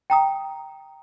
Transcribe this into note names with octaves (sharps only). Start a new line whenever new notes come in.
G5 A#5 D#6